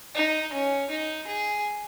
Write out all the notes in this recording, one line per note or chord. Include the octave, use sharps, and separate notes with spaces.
D#4
C#4
D#4
G#4